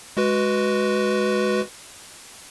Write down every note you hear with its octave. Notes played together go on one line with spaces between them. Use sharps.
G#3 F#4 B4